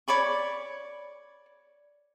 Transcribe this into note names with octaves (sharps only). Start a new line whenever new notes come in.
C#5 D5 B5 C#6